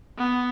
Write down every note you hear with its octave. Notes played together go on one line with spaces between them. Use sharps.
B3